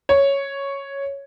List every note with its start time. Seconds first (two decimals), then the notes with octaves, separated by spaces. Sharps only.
0.09 C#5